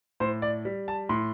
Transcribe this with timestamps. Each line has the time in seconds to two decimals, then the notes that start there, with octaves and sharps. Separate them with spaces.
0.20 A2 C5
0.42 D5
0.65 G3
0.88 A5
1.09 A2 C6